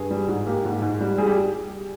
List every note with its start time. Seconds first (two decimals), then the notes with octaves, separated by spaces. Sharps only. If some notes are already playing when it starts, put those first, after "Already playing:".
Already playing: G2 G#4
0.11 G3
0.28 G#2
0.47 A#3 G4
0.65 G#2
0.82 G#2
1.01 G3
1.18 G3 G#4
1.27 G4